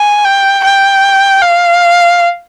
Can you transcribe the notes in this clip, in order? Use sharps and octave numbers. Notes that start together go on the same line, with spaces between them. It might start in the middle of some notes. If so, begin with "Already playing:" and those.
Already playing: G#5
G5
G5
F5